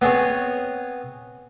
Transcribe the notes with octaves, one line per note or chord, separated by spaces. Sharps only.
B3 C4 G#4 C#5